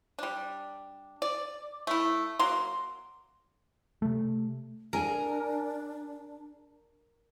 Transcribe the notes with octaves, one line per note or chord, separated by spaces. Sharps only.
G3 D4
D5
A3 E4
F#3 A#3 C6
C3 A3
D4 G#4 A#4 G#5